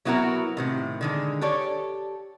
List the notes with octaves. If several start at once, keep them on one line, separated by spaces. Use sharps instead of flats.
F#3 B3 E4 F#4 A4 A#4
A2 C3 D#3
D3 D#3 G#3
G4 A4 C#5 D5